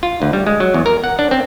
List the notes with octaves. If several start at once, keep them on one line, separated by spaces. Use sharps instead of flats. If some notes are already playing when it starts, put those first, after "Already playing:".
F4
D2
G3
G#3
F#3
E2
A#4
F#5
D4
C4